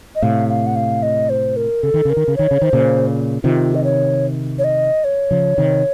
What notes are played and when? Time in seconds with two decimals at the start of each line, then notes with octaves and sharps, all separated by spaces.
0.15 D#5
0.22 A2 C3 F5
0.49 F5
0.67 F#5
0.76 F5
1.03 D#5
1.30 C5
1.56 A#4
1.83 C#3 A4
1.94 D#3
2.05 C#3 A#4
2.17 D#3
2.28 C#3
2.36 D#3 C#5
2.51 C#3
2.61 D#3 C5
2.73 A#2 C#3
3.43 C3 D#3 F4
3.75 D#5
3.84 C#5
4.59 C#5
4.64 D#5
5.04 C#5
5.31 C#3 F3
5.58 C3 D#3